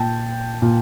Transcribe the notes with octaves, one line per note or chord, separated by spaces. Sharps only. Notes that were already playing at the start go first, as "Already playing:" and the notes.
Already playing: A#2 G5 A5
A#2